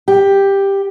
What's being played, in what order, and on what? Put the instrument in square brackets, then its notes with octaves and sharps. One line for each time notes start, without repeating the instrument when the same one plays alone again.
[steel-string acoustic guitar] G4